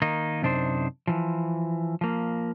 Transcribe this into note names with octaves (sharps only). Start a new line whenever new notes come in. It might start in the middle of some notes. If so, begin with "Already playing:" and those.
D#3 A#3 D#4
F#2 C3 D4 D#4 C5
E3 F3
F3 A#3